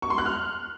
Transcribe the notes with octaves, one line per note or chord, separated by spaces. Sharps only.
C#6
C6
F#6
F6